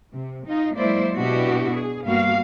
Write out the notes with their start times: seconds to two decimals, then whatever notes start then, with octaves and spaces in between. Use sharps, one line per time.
0.15 C3
0.47 D#4 F4
0.77 F#3 G#3 A#3 E4 C5 D5
1.15 B2 B3 D4 E4 F#4 G4
1.74 G#4
2.05 G2 G3 A#3 B3 F#4 F5